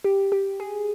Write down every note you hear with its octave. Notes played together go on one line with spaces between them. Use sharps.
G4
G4
G#4